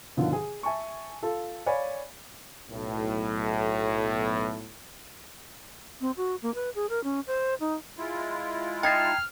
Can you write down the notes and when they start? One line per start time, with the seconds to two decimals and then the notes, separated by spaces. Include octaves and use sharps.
0.17 G2 B2 D3 D#3 F3 F4
0.33 G#4
0.63 E5 G#5 A5 C#6
1.23 F4 A4
1.66 C#5 D5 F5 G#5 B5
2.71 B1 A2
6.01 C4
6.17 F#4
6.42 A#3
6.55 B4
6.75 G#4
6.89 A#4
7.04 C#4
7.27 C5
7.61 D#4
7.98 G#3 E4 F4
8.83 D#4 G5 A5 F6 G#6 C7